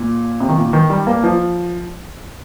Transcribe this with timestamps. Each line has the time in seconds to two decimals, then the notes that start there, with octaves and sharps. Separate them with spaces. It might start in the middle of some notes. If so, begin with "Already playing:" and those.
Already playing: A#2
0.40 C3
0.49 D#3
0.58 A#2
0.73 D#3
0.90 G3
1.07 A#3
1.23 F3